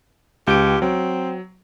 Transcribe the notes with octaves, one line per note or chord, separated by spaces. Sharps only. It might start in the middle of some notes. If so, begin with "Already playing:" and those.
C#2 G4 D7
F#3 C4